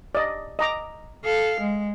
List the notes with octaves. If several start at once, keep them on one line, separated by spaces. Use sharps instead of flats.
D5 D#5
D#5 A#5 D6
A4 F5
G#3